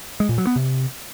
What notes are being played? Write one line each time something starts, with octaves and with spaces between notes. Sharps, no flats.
G#3
A#2
F#3
B3
C3